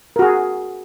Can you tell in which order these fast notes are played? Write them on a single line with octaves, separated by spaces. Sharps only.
A#4 F#4 G#4